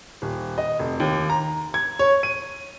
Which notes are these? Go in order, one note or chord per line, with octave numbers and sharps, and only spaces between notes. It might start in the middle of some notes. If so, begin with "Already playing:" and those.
D#1
D#5
F1
D#2
A#5
G#6
C#5
D#7